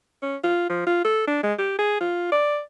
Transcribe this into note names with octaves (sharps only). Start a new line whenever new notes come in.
C#4
F4
F3
F4
A4
D4
G#3
G4
G#4
F4
D5